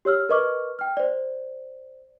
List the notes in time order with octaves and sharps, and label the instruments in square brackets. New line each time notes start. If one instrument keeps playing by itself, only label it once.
[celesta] G4 C#5 E6 F6
A#4 B4 D#5 C#6 D6 F6
G5 F6
C5 D5